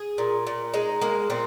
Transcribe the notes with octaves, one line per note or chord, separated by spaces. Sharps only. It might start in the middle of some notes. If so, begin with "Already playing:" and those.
Already playing: G#4
A#2
A#2
G#3 D#4
G#3 A#3
A#2 C4